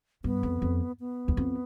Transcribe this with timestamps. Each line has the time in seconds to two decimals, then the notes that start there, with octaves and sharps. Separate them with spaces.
0.24 G2 B3
0.43 F2
0.62 F2
1.00 B3
1.28 E2
1.37 F2